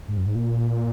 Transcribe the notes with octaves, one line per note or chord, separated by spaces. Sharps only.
G#2
F#2
G#2
A#2